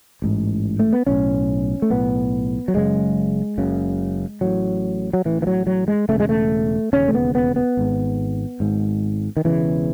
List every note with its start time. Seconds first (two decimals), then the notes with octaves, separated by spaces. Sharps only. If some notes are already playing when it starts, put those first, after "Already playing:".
0.22 A1 G#2
0.79 A3
0.93 B3
1.07 B1 A2 C#4
1.82 A3
1.90 B1 A2 B3
2.68 F#3
2.74 F#1 F#2 C#3 G#3
3.58 F#1 F#2 C#3
4.41 A1 A2 F#3
5.13 F#3
5.25 A1 A2 E3
5.42 E3
5.47 F#3
5.67 F#3
5.88 G#3
6.09 E1 D#2 C#3 A3
6.20 G#3
6.29 A3
6.93 E1 D#2 C#3 C#4
7.08 A3
7.14 B3
7.35 B3
7.56 B3
7.77 G#1 G#2
8.60 G#1 G#2
9.37 D#3
9.44 E1 E2 C#3 E3